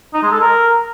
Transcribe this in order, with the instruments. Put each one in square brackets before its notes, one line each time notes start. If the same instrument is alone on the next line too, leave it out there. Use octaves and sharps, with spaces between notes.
[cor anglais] D#4
G#3
A4
A#4